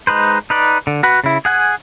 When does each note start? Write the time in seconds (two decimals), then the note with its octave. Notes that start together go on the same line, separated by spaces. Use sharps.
0.07 G#3 D#4 B4 C5
0.50 D#4 B4 D5
0.87 D3
1.03 F#4 B4
1.24 C#3 E4
1.45 G#4 F#5 G#5